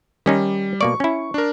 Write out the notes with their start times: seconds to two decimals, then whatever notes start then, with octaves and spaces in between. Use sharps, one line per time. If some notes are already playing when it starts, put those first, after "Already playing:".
0.26 D#3 G3 C#4 D#4
0.81 B2 A#3 D5 C#6
1.00 C#4 E4
1.34 D4 A#4